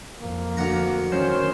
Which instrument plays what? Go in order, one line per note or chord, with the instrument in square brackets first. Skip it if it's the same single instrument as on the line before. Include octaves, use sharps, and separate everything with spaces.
[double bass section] F2 [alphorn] A#3
[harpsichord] D2 F#5 A#5
[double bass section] D#3 F#3 [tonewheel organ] C#4 C5